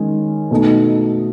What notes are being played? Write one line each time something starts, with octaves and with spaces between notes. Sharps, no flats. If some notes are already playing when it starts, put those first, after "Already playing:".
Already playing: D#3 G#3 C#4
B2 A3 D#4